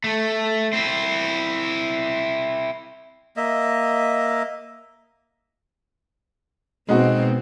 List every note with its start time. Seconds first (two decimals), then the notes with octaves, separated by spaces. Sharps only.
0.04 A3
0.73 C4 E4
3.37 A#3 D#5 E5
6.89 B2 G#3 B3 C4 D#4 F#4